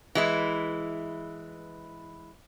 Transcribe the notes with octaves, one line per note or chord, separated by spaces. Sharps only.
E3 G#3 E4